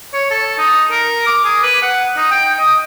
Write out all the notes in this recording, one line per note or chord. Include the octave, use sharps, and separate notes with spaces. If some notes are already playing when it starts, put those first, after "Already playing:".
C#5
A4
D#4
A#4
D6
G#4
B4
F#5
D#4
G5
D#5